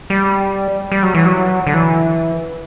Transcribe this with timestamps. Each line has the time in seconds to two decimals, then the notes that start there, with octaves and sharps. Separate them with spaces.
0.10 G3
0.92 G3
1.03 F#3
1.15 E3
1.25 F#3
1.67 D3
1.74 E3